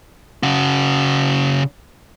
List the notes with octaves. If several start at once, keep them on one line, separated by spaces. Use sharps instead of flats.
C#3 F#4